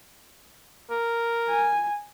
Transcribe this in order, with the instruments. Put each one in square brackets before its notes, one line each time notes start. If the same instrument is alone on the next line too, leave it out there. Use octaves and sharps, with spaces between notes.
[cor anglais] A#4
[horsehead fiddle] G#5